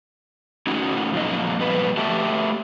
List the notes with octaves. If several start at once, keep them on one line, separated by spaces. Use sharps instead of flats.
A2 C#4 D#4 F#4
F2 A#2 F#3 D#5
G2 A#2 F3 B3 B4
A3 F#4 G4 E5 G5 A5